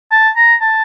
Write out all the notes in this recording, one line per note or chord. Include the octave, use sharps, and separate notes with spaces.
A5
A#5
A5